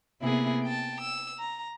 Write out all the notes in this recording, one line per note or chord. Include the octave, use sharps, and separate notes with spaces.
C3 A#3 B3 E4 G#4
G5 A5
E6
A#5